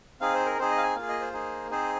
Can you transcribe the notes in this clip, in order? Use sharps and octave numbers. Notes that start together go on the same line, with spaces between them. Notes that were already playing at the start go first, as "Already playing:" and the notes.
C4 D#4 G#4 F5
C5
A#4
C4 D#4 G#4 C5
D#5
F5
G#5
A#3 F4 G#4 F5
D#5
C5
A#3 D#4 G#4
C4 D#4 G#4 C5